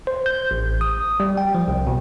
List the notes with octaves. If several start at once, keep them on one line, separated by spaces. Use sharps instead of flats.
C5
G6
A1
D#6
G3
G5
F3
C2
B2